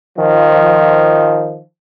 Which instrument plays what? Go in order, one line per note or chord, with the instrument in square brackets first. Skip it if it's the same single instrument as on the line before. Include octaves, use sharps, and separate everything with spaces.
[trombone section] D#3 F3